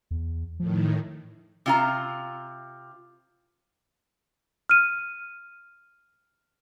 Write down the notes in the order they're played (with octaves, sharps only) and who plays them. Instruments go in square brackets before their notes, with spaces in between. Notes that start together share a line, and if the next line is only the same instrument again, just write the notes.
[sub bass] E2
[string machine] A2 D#3 [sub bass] F3
[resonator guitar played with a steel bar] C3 F4 A#5
[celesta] F6 D#7